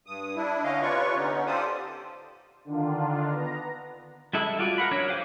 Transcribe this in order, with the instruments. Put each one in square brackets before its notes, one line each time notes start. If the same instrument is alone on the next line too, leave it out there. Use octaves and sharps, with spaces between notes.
[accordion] G2 D#6
D4 E4
D3 C#4 D#5 F5
C3 F4 B4 C#5 D5 C#6
D3 B3 C#4 D#4
F4 G4 A4 C5 D5 D#6
[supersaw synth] D3 D#3 D4 F4
B3 A#5
[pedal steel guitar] G3 G#3 E4 A4 E5
F4 F#4 D5
A#4 F#5 B5
F#3 D4 C#5
G4 C5 F5 G#5 D6